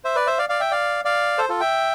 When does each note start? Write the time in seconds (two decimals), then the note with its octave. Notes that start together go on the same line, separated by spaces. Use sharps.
0.05 C5 E5
0.16 B4 D5
0.27 C5 E5
0.39 D5 F5
0.49 D5 F5
0.60 E5 G5
0.71 D5 F5
1.05 D5 F5
1.38 A4 C5
1.49 F4 A4
1.60 E5 G5